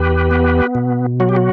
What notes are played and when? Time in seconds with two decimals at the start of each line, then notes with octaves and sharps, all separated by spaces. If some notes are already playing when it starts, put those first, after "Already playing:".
Already playing: E2 G4 B4
0.31 B3
0.75 B2
1.20 F#3 F#4
1.29 G4
1.36 F#4